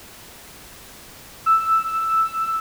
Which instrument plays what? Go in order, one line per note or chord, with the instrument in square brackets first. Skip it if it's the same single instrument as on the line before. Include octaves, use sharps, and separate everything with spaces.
[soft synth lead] E6